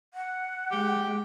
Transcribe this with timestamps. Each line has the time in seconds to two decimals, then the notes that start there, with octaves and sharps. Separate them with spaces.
0.14 F#5
0.72 G#3 G4